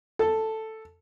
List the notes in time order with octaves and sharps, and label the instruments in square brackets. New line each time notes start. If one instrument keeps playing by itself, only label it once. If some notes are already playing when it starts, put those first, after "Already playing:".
[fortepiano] A4